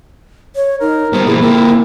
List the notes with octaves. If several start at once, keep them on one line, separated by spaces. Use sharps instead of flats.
C#5
D#4 A#4
G3 B3 C5
A#2 E3 E4 G#4
A#2 C4 A#4